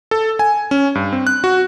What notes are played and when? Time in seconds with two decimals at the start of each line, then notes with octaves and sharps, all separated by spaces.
0.11 A4
0.39 G#5
0.71 C#4
0.95 G2
1.13 C4
1.27 F#6
1.44 F#4